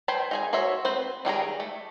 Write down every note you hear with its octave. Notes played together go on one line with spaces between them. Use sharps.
B4 C5 G5 G#5
D#4 G#4 G#5
F#4 C5 C#5 E5
C4 B4 C5
D#3 G3 G#4 A#5
A3